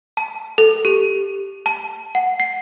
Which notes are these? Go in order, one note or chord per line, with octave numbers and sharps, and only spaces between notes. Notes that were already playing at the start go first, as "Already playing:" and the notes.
A5
A4
G4
A5
F#5
C7